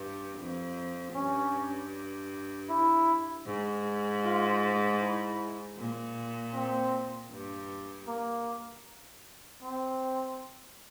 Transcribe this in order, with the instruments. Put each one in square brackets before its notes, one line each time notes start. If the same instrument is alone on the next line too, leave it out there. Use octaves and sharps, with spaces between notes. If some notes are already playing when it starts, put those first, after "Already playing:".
Already playing: [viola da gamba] G2
F2
[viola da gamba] G2 [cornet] C#4
[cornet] E4
[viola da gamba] G#2
[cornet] F4
E4
[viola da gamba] A#2
[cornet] C4
[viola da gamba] G2
[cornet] A#3
C4